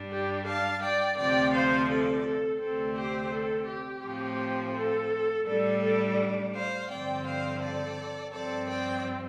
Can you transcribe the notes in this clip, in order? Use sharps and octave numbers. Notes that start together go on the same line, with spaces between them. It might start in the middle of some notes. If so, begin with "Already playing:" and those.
Already playing: G2 G3 D4
G4
F5 A5
D5 G5
D2 C3 F3 D5 G5
C5 F5
A4 D5
A4
D2 C3 A3 C4 A4
G4 C5
A4
G4
A2 F3 C4
A4
A2 G3 D4 A4
A4
C5 F5
G2 D3 F3 C4 D5 G5
C5 F5
A4 D5
G2 F3 C4 A4 D5
D5 G5